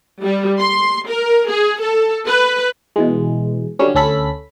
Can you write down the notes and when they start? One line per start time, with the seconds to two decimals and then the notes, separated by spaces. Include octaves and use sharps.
0.22 G3
0.59 C6
1.08 A#4
1.48 G#4
1.82 A4
2.27 B4
2.96 B2 E3 G#3
3.79 D3 F#3 G3 C#4
3.95 D2 C#4 A4 B5 B6